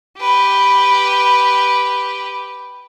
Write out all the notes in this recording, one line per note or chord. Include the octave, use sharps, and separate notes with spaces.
G4 B4